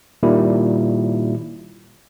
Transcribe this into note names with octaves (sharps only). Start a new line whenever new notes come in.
A#2 D#3 G3 E4